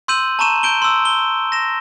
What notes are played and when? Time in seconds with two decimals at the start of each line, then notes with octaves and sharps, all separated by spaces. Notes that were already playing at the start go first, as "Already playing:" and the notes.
0.08 C6 E6 G6 D#7 F#7
0.39 A5 A#5 C#6 D#7 E7
0.63 G6 D7 G7
0.82 C6 E6
1.05 G7
1.52 A#6 E7